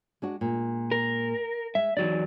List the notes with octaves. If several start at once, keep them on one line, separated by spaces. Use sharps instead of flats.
G#3 D4 F#4
A#2 G#3
A#4
G#3 E5
E2 F#3 D#4 D5